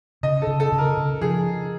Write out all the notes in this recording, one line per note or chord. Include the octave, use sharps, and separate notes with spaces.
C#3 D#5
A4
C#3
A4
C#3
A#4
C#3
F3 G#4